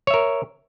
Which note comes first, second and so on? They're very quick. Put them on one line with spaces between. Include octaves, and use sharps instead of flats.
C#5 E5 A#4